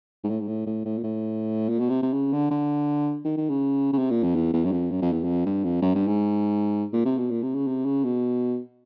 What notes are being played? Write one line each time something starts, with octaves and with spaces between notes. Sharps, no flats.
G#2
A2
G#2
A2
A2
A2
A#2
A2
A#2
B2
C3
C3
C#3
D3
D3
D#3
D#3
C#3
C#3
C3
A#2
F2
E2
E2
F#2
F2
F#2
F2
E2
F2
G2
F2
F#2
G2
G#2
A#2
C3
B2
A#2
C3
C#3
C3
C#3
B2